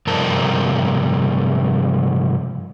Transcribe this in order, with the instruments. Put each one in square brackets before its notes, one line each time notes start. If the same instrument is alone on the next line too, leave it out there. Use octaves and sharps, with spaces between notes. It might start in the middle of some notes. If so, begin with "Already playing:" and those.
[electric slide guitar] G2 C3 F3 A#4 A5